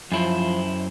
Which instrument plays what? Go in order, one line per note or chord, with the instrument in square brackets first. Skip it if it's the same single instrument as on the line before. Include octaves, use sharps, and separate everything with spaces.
[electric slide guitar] F#2 E4 C5 [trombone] F3